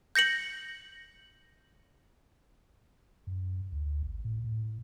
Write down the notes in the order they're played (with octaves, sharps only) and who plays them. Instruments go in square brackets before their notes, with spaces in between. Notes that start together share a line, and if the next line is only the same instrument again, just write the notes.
[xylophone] G6 A#6 C#7 F#7
[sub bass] F#2
D2
G#1
A2
A2